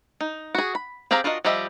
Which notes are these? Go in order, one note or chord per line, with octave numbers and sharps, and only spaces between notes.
D#4
F#4 G#4
B5
C4 G4 G#4 F5 A#5
D4 F4 F#4 A#4 D#5
F3 G3 G4 D#5 E5